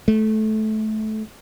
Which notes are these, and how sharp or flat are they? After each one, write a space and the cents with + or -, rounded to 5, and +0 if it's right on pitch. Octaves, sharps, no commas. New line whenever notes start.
A3 -20